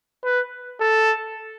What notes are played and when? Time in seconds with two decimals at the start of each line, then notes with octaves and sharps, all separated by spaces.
0.24 B4
0.80 A4